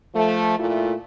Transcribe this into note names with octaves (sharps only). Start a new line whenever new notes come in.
F3 A3
A#2 A3 E4 F4